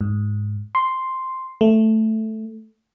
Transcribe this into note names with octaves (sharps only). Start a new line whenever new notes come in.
G#2
C6
A3